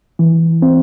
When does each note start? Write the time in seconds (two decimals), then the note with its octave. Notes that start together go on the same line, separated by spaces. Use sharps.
0.19 E3
0.62 C4